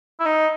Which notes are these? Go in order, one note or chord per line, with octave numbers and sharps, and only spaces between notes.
E4
D#4